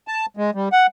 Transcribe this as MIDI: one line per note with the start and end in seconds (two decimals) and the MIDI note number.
0.08 0.26 81
0.37 0.51 56
0.55 0.69 55
0.72 0.87 78